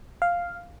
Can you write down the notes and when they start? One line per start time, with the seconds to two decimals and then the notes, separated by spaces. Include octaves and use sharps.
0.22 F5